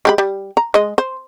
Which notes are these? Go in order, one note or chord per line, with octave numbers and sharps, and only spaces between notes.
G#3 G4 B5
G3
A#5
G#3 D#5
C5